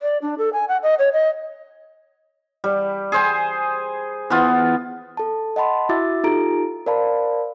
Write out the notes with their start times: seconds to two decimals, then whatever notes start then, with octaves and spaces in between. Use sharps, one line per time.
0.02 D5
0.22 D4
0.38 A4
0.53 G#5
0.68 F#5
0.83 D#5
0.99 C#5
1.13 D#5
2.64 G3
3.12 G#4 C5 G#5
4.30 E3 B3 F4
5.17 A4 A5
5.56 D#5 F#5 A5 B5 C6
5.89 E4 F#4 E5 D6 E6 A6
6.24 D#4 F4 G4 A4 A#5 D7
6.86 A#4 C5 D5 F5 A5 B5